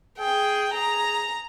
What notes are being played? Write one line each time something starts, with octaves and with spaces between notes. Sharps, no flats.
G#4 G5
G#4 A#5